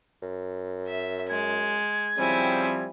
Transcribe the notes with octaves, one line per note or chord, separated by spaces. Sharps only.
F#2
E5
G#3 G#6
C#3 F3 G3 C4 E4 G#5